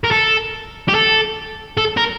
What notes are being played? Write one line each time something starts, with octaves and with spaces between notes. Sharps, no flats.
A#4
A4
G4
A4
A4
A#4